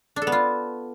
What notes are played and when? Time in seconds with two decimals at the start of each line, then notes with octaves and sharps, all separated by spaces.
0.16 D4
0.22 A4
0.27 B3
0.32 F4